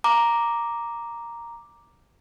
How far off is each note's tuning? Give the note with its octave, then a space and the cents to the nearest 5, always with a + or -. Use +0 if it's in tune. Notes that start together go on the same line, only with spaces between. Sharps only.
A#5 +0 D6 +0